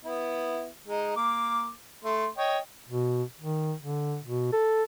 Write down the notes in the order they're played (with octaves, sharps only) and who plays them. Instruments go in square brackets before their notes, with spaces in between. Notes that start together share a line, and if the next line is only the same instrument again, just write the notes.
[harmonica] B3 E4
G#3 D#4
A#3 D6
A3 C6
C#5 D#5 G5
[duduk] B2
D#3
D3
B2
A4